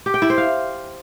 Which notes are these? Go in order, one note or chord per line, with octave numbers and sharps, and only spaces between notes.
G4
G5
E4
C5
F5